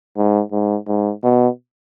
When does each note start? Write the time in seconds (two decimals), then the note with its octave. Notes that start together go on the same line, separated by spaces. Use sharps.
0.17 G#2
0.52 G#2
0.88 G#2
1.23 B2